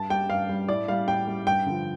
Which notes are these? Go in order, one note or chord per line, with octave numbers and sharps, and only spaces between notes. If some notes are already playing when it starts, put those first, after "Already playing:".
Already playing: G2 A5
G3 G5
G2 F5
G3
A2 D5
G3 F5
A2 G5
G3
G2 G5
D3 F3